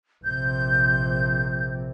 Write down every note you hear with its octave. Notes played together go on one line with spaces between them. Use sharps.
A#1 C3 G6